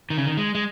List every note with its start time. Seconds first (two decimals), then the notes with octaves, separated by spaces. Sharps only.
0.10 D#3
0.18 C#3
0.26 D#3
0.37 G#3
0.55 G#3